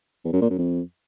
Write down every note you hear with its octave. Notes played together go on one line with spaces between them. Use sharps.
E2
F#2
A#2
F#2
F2